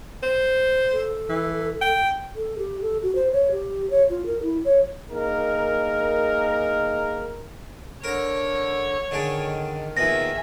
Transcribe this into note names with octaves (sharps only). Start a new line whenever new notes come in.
C5
A4
E3
G5
A4
G4
A4
F#4
C5
C#5
G4
C#5
F4
A#4
E4
C#5
A#3 D#4 G#4 A#4
D3 A#4 C#5 A#5
D3 D#3 G#3 D4
D#2 A#2 B3 G#4 E5 A#6